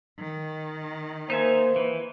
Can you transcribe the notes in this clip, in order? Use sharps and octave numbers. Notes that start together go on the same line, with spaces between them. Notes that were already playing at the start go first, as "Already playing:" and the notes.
D#3
A#3 D#4 C5 E5 G#5
E3 B4